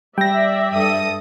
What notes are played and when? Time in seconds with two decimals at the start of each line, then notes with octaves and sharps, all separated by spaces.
0.18 G3 D5 E5 G5 A#6
0.74 G2 A4 D#6